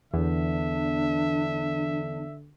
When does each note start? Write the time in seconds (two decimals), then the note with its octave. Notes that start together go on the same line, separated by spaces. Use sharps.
0.14 E2 D3 D4 E5